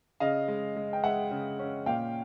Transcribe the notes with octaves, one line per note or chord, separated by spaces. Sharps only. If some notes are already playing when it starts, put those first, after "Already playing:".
C#3 D#5 F5
G#3
G#3
G5
G#3 E5 F#5
C#3
C#4
A#2 F5 G5